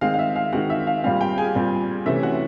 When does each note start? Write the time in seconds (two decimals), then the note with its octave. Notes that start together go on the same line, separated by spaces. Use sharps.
0.01 D#3 G#3 C4 F5
0.14 F5
0.19 E5
0.36 F5
0.53 D#3 G#3 C4 F#4 F#5
0.70 E5
0.87 F5
1.03 A#2 G3 C4 F5
1.21 G4 G5
1.38 G#4 G#5
1.55 A#2 G3 C4
2.06 C3 E3 A3 C#4 E5
2.23 F#4 F#5